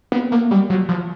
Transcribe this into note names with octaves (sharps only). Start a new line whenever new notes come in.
B3
A#3
G3
F#3
F3